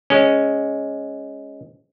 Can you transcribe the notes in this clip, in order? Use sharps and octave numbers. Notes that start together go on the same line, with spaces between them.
G#3 C#4